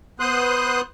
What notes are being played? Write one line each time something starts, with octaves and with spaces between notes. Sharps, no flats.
B3 C5 C6 D#6 F#6